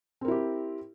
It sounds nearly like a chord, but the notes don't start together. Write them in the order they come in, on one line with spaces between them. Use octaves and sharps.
C4 A#4 E4 G4